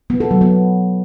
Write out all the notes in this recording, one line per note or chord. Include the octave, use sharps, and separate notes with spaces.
B3
A4
F#3
B3